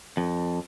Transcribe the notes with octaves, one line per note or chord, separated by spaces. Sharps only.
F2